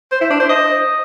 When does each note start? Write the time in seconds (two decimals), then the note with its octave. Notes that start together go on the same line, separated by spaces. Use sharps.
0.12 C5
0.21 E4
0.30 D4
0.40 C5
0.49 D#5